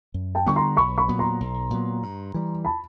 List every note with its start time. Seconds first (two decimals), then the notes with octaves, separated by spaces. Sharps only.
0.14 F#2
0.35 G5 A5
0.46 D3 G3 B3 C#6
0.56 A#5 C6
0.77 B1 B5 C#6
0.98 B5 C#6
1.08 A#2 F#3 B3
1.19 A#5 C6
1.40 B1
1.71 A#2 F#3 B3
2.03 G2
2.34 E3 G3
2.65 A5 B5